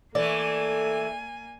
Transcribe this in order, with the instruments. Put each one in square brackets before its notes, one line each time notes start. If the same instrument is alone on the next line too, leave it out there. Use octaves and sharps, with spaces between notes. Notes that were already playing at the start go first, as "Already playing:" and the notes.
[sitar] E3 A3 [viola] A#3 G#5 [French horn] A4 [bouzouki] D5